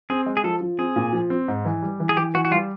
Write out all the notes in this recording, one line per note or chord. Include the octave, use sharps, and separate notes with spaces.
C4 G#4
G#3
G#4
F3 A4
F3
C4 G#4
A#2
F3
C4
G#2
E3
G3
E3
G#4
E3 G4
E3 F#4
F#4
G3 F4